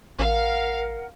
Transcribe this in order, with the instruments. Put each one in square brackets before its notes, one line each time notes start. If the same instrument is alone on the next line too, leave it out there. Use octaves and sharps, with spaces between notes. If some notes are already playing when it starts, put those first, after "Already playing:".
[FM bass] A1 [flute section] A#4 F#5 [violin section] F5